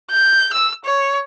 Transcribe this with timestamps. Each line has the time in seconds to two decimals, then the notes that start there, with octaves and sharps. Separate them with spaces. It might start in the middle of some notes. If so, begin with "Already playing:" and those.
0.11 G6
0.53 E6
0.85 C#5